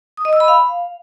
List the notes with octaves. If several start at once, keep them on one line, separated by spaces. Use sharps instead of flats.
D#6
D#5
E6
B5
F5